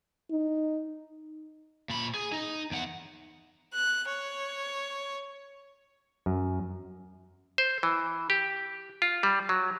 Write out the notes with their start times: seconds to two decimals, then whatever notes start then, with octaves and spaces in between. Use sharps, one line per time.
0.31 D#4
1.90 A#2 B5
2.14 G#4
2.32 D#4
2.71 E2 F#5
3.74 F#6
4.08 C#5
6.26 F#2
7.58 C5
7.83 E3
8.30 G4
9.02 F4
9.23 G3
9.49 F#3